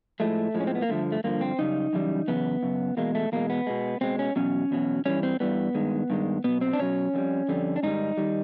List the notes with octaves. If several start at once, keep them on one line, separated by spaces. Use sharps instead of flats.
A2 F3 G#3 A3
A2 F3 G#3
C#4
C4
B3
A#3
G2 D3 F3 A3
A3
G2 D3 F3 A#3
C4
F#2 C#3 G3 D#4
F#2 C#3 E3 G3
F#2 C#3 E3 B3
F#2 C#3
E2 B2 G#3 A#3
A3
E2 B2 G#3 A#3
B3
B2 G#3
B2 G#3 C4
C#4
E2 B2 F#3 C#4
E2 B2 F#3
G2 E3 G3 C#4
C4
G2 E3 G3 B3
G2 D#3 G#3
G2 D#3 G#3
B2 F#3 B3
C4
D4
B2 F#3 C#4
F2 D3 G3
F2 D3 G3
D4
G#2 D#3 G3 D#4
D#3 G3